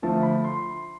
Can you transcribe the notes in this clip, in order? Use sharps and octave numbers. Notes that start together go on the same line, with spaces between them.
D3 F3 A3 A5
B5
C6